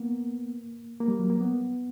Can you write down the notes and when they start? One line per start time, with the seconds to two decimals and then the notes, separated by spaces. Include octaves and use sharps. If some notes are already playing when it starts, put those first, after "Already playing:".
Already playing: A#3 B3
1.00 A#3
1.08 G3
1.19 F#3
1.30 A#3
1.41 B3